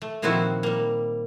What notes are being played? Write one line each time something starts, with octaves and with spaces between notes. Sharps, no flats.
A3
A#2 D#3 F3 C4 E4 F#4
G3 A#3